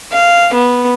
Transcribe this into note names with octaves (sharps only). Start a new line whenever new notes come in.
F5
B3